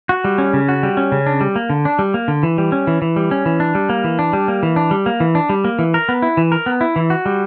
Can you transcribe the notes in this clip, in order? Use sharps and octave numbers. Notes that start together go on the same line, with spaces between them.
F#4
G3
C#4
C#3
F#4
G3
C#4
C#3
D4
G3
A#3
D3
D4
G3
A#3
D3
E3
G3
C#4
E3
E3
G3
C#4
E3
D4
G3
A#3
E3
D4
G3
A#3
E3
D4
G3
A#3
E3
D4
G3
A#3
E3
A#4
B3
E4
E3
A#4
B3
E4
E3
F#4
G3